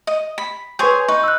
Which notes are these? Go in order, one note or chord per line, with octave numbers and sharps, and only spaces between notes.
D#5
B5
G#4 B4 C#5 G#5 C6 G6
D#4 B4 C#6
E6 F#6